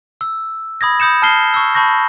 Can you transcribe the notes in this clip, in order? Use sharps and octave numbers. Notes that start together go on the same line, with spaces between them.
E6
B5 D#6 G#6 A#6
B5 D#6 G6 C#7 E7
A5 D#6 F6 C7 G7
C#6 E6
A5 B5 C#6 G6 A#6